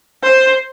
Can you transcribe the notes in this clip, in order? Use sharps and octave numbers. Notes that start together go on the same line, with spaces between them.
C5